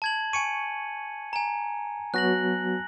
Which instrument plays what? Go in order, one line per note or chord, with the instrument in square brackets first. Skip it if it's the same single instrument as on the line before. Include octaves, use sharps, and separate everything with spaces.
[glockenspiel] A5 G#6 F#7
[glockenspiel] G#5 C#7 D#7 [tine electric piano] C#6
[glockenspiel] G#5 A#5
[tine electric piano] F#3 B3 F#4 [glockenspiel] F#6 A#6 F#7